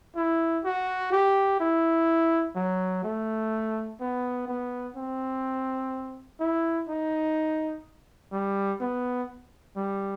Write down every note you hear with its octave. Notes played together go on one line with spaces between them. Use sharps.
E4
F#4
G4
E4
F#3
A3
B3
B3
C4
E4
D#4
G3
B3
G3